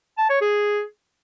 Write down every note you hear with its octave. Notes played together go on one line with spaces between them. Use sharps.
A5
C#5
G#4